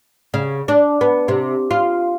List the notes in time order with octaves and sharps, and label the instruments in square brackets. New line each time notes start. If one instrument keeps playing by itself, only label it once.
[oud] C#3
D4
B3
C3
F4